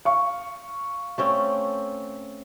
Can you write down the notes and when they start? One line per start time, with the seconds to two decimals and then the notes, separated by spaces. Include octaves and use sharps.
0.05 F5 C#6
1.18 A3 C4 C#4